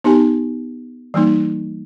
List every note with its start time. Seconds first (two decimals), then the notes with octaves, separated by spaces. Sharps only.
0.04 B3 D#4 G4 G#5
1.14 E3 G3 A#3 D#4